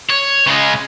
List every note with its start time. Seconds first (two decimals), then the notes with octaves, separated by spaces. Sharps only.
0.10 C#5
0.47 C#3 G#3